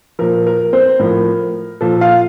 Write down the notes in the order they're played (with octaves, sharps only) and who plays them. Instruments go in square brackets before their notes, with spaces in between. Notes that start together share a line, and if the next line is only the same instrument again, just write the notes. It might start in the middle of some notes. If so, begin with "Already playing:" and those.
[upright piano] A#2 F3 A#4
A#4
C4 C5
A2 F3 A#4
A#2 F3 A4
F4 F5